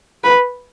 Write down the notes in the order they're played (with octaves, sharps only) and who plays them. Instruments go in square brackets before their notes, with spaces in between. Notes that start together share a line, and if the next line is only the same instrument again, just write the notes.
[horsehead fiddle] B4